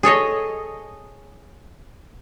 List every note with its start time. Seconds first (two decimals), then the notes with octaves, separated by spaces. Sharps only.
0.03 G#4 A4 C#5 D#5